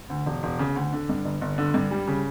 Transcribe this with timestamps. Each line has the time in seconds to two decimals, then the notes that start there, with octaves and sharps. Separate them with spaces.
0.10 D2
0.26 E1
0.43 E1
0.59 C#3
0.76 D2
0.93 D3
1.09 G2
1.25 G1
1.41 G1
1.58 D3
1.74 G2
1.91 G3
2.07 C#3